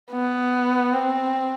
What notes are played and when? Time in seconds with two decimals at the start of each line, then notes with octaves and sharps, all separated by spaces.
0.12 B3
0.94 C4